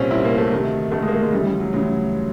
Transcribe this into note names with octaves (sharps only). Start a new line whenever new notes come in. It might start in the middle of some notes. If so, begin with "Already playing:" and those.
Already playing: C2 A#2 C4 C#4
C2 A#2 E4
A#3
A3
D2 C3 D#3
D2 C3 D#3 A3
G#3
A#3
A3
G#3
D2 C#3 E3 G3
G3
F#3
D2 C#3 E3 F#3